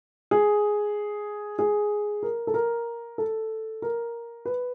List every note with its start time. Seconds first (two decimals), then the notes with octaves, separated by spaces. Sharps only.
0.31 G#4
1.59 G#4
2.23 A#4
2.47 A4
2.54 A#4
3.18 A4
3.82 A#4
4.45 B4